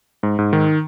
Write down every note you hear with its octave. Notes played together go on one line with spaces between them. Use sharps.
G#2
G#2
D#3